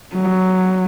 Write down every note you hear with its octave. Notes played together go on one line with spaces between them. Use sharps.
F#3